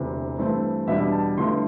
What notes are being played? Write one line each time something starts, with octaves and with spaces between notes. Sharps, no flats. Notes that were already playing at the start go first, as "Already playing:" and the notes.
Already playing: E1 D2 C3 E3
G2 E3 A3 C4
E2 B2 G3 D4 E5
A5
G1 G2 D3 A3 E4 C6